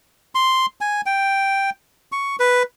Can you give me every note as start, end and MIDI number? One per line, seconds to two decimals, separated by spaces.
0.35 0.66 84
0.81 1.01 80
1.06 1.70 79
2.12 2.36 85
2.40 2.63 71